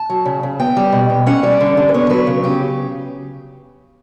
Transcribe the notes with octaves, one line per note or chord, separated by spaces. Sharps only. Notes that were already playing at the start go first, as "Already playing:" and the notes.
Already playing: A5
F#3
C#3
C#3
B3 G5
G3
B2
B2
C#4 F#5
G3 D5
D3
D3
B4
B3 C#5
F#3 B4
C#3
C#3 G4